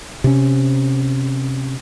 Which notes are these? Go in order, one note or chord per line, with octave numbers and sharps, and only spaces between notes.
C3 C#4